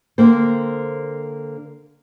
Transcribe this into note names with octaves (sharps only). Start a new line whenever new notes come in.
D3 A#3 C4 C5